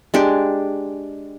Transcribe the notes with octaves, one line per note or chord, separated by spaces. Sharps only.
G#3 D4 G4